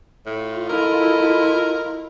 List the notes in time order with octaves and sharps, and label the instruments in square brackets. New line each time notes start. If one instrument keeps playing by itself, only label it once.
[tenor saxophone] A2 [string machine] F4
[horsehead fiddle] E4 [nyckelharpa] A4 D#5 [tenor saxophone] A#4